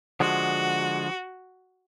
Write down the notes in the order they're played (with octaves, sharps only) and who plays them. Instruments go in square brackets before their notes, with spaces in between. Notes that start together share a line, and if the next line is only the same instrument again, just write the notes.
[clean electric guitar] D3 F3 G#3 [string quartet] F#4